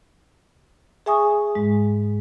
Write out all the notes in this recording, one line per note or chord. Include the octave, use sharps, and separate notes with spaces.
G#4 E5 G#5 C#6 D#6
G#2 G#3